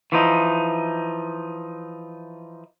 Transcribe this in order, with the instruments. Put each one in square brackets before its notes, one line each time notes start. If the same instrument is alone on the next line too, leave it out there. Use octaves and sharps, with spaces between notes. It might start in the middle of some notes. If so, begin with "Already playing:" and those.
[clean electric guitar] E3 F3 D#4